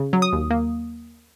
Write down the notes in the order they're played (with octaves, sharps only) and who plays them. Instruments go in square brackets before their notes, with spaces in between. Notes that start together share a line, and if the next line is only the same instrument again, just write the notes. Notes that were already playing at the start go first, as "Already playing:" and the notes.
Already playing: [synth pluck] C#3
F#3
D#6
D#2
A#3